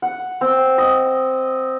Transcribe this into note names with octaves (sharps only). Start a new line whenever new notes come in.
F#5
C4
D#5